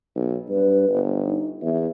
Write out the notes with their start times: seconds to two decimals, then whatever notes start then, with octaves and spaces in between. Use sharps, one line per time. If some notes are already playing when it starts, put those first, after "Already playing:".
0.15 B1
0.49 G2 B4
0.88 G1
1.26 D#4
1.62 E2 E5